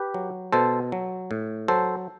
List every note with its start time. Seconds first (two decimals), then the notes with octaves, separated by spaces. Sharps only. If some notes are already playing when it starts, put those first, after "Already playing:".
Already playing: G4 B4
0.14 F#3
0.53 B2 A4 C5
0.92 F#3
1.31 A2
1.68 F#3 A4 C5